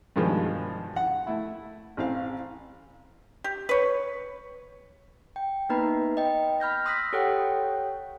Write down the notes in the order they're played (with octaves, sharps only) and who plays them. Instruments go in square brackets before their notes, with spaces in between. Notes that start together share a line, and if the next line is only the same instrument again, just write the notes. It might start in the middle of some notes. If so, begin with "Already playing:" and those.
[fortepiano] G2 B2 D#3 F3 G#3
F#5
A3 E4
A1 C4 F5
[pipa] G4
B4 C#5
[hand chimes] G5
A#3 B3 D#4 B4 A#5 B5
D#5 G5
B5 F6 G6 A#6
C6 D#6 E6 F#6 A#6 B6
G4 A4 C#5 F#5 G5 F#6